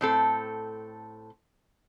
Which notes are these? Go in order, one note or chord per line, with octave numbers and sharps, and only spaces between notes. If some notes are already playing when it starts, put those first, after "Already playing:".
A2 C4 A4